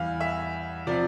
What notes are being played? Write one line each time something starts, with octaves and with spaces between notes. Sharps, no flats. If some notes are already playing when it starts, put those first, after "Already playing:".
Already playing: E2 E3 G3 F5
E5
C3 F3 D5